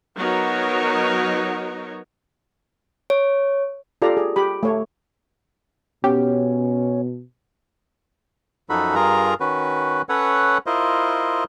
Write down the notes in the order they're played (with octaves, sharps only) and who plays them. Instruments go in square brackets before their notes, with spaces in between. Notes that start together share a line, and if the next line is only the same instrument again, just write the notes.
[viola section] F#3 B3 D#4 F#4 A#4 C#5
[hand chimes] C#5
[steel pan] F4 G4 A4 D5 F5 A#5
G#4
G4 B5
A3 C#5
[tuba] B2 [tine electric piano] B3 [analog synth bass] C#4 [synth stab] G4
[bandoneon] F#2 F3 D#4 F#4 A4 B5
G2 F4 G#4 A#4 A#5
D#3 C#4 F#4 B4
C#4 A4 B4 C#5 F#5
E4 F4 A#4 C5 D#5